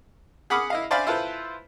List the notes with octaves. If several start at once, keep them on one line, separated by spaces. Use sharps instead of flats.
G#4 F#5 B5 D6 D#6 F6
E4 D#5 F5
C5 D5 E5 F5 G#5 B5
E4 F4 A4 B4 C5